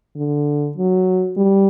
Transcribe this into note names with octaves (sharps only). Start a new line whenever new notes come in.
D3
F#3
G3